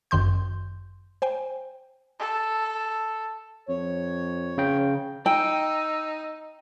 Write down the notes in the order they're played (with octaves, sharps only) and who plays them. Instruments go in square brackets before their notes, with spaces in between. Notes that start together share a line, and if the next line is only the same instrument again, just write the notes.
[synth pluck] G1 F#2 D#3 C6 G6
C5 G5 G#5
[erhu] A4
[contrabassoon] F2 [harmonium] C#5
[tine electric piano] C#3 G5
[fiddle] D#4 [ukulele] G5 [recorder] E6